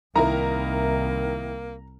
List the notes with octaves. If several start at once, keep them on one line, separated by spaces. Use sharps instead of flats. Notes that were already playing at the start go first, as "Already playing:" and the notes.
C2 D#3 A#3 E4 A#4 A#5